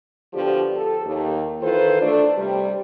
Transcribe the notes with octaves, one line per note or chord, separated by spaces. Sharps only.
B2 D3 F3 G4
A4
D#2
D#3 E3 F4 A4 B4 C5
A3 D4
C3 G3